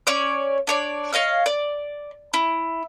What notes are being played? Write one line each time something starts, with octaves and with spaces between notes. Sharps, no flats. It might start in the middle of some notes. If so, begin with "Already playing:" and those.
C#4 C#5 D5
D4 C#5 D5
C#5 D#5 F5 F6
D5
E4